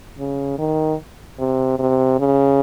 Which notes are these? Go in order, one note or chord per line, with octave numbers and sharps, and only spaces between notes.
C#3
D#3
C3
C3
C#3